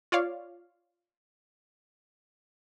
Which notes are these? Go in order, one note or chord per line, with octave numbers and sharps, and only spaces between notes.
F4 C#5 D5 F5